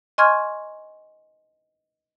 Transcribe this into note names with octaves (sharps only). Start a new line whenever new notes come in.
D#5 G#5 C6 C#6 F6 G#6